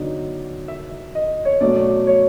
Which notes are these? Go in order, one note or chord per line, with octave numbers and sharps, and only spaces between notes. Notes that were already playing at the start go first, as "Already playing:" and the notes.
Already playing: D3 F#3 B3 D#4 D5
E5
D#5
C#5
B2 F#3 A3 C#4 D5
D5
C#5